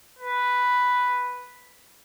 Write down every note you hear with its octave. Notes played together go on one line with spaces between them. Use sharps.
B4